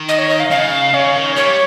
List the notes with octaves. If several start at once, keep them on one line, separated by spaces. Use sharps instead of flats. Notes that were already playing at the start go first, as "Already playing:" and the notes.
Already playing: D#3
D#5
C#5
D#5
F5
C#3 F5
C#3 C#5
D#3
G3 C#5